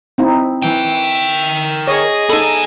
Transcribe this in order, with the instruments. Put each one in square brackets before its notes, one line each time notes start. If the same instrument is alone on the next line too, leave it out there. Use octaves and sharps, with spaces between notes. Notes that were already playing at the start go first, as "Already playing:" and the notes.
[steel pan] C4 D#4 E4
[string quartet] E3 [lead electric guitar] A#4 G5
[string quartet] E5
[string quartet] G#4 D#5 [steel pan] C#5
[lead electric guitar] B3 G#5 [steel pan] D#4 A4